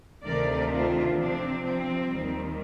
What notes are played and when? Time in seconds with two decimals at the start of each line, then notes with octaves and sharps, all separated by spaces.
0.24 D2 C3 D#3 A3 A#4 D5
0.71 D4 F4
1.17 C3 F3 C4 D4
1.64 C4
2.11 D#2 D#3 G3